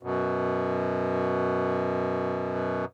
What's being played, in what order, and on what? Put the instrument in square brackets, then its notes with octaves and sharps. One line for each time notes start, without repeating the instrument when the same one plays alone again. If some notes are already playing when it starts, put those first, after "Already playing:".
[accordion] F#2 B2